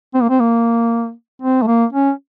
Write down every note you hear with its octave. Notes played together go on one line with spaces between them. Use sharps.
C4
A#3
C4
A#3
C4
A3
A#3
C#4